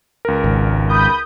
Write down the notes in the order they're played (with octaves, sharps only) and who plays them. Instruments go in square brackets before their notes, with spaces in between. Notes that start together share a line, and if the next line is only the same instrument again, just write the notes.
[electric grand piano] C#2 A#4
[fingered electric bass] G#1
[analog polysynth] B5 D#6 G6